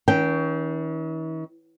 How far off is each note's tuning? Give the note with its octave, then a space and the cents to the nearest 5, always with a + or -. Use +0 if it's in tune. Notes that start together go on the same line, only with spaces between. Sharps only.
E3 -45 C#4 +20 G5 -10